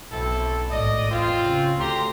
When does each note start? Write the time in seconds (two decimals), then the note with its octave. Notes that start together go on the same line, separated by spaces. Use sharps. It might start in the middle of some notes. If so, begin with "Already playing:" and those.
0.11 B1 C4 E4 A4
0.70 G#1 A2 D5 D#5
1.09 E2 C4 F4
1.43 C#3
1.78 D2 G4 A#5 C6